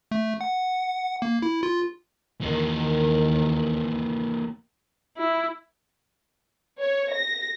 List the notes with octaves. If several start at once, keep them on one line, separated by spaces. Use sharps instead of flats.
A3
F#5
A#3
E4
F4
D#2 D#3 E3 A#3
E4
C#5
A#6